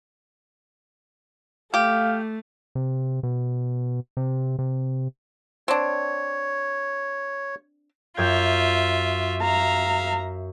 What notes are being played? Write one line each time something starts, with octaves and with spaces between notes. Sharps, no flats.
A3 G4 F5
C3
B2
C3
C3
C4 D4 C#5
F#2 F4 E5 G5 G#6
E5 F5 A#5